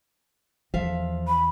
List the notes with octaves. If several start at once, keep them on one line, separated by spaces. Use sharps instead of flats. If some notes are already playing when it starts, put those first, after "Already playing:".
E2 F3 E5 F5
B5